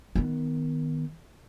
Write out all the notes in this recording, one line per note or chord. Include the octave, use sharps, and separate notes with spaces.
D#3 B3